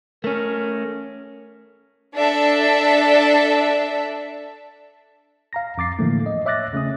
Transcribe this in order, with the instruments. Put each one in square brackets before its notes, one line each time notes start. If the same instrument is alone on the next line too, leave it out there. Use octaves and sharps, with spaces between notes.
[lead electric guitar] A3 C#4 [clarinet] A#4
[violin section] D4 A4 E5
[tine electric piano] F5 A#5 A#6
F2 D6 A6 C7
A2 D3 E3 F3 A3 A#3
D#5
C#5 E5 D6 F#6 A6 A#6
C#3 A3 C#4 D#6